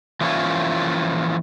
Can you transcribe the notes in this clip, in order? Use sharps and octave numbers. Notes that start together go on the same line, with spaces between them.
E3 F3 A#3 C#4 E4 F4